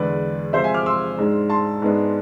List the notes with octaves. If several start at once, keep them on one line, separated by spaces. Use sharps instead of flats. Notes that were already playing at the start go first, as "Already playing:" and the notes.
Already playing: E2 D3 G#3 B4 D5
C3 F3 G#3 C5 E5
E5 G#5
D6 F6
C6 E6
G#2 G#3 D4
A5 C6
G#2 G#3 B3 D4